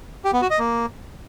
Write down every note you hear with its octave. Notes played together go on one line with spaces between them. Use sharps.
G4
B3
F#4
D#5
A#3